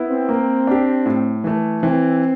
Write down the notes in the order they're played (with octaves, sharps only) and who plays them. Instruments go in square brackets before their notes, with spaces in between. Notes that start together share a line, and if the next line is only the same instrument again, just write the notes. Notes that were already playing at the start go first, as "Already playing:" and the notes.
Already playing: [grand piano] B3 E4
[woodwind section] C4
[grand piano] A#3
D4 G4
A2
E3 A3
[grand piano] E3 [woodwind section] C4